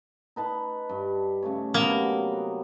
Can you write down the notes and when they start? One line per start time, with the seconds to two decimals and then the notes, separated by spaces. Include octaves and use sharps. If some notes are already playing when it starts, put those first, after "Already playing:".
0.36 D#4 B4 A5
0.89 G2
1.43 C#3 A3 C#5
1.74 C3 F#3 A#3 B3